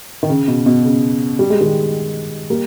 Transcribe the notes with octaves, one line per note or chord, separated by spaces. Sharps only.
D#3
C#3
B2
B2
C#3
G3
G#3
D#3 G3
G3 A#3